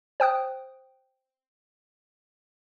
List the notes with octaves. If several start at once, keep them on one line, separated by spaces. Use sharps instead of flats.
C5 G5 D#6 F#6